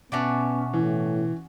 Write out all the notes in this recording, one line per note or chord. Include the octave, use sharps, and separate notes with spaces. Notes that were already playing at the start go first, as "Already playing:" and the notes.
B2 B3 C#4 F#4 D5 E5 A5
A2 E3